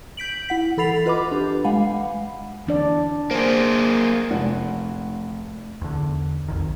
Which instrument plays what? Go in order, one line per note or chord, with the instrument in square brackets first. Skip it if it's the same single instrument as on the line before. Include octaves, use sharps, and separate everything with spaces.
[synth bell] G6 B6 D7 F#7
E4 F#5 B6
E3 A4 B5 A6 C7 F7
F4 B4 D#5 B5 D6
D4 G4
G#3 F5 F#5 G#5 B5
[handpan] E3 D4 D5
[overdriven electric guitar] A#3 G#4 [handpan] C5
[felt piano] F1 F#5
[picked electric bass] E2 D3
B1 F2 D#3